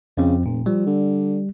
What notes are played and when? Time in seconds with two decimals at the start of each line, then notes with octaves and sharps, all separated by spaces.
0.17 F2 C#3 F3 C4
0.46 F1 A#2
0.66 F3 G3
0.86 D3